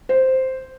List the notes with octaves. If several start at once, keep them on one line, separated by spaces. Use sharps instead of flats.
C5